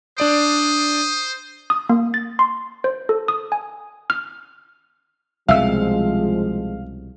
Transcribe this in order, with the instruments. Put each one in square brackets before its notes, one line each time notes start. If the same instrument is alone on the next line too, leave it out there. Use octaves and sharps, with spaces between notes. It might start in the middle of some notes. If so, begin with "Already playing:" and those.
[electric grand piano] D4 D5 D7 [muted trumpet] C5 [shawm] D#6
[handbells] D#6
A#3
A6
C6
C5
A4
D#6
G#5
F6
[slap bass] C2 B2 [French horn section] F3 G#3 [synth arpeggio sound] E5 E6 [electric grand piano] F5